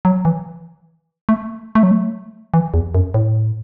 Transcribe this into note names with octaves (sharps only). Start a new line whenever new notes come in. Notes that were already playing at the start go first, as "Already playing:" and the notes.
F#3
E3
A3
A3
F#3
A3
E3
E2
F#2
A2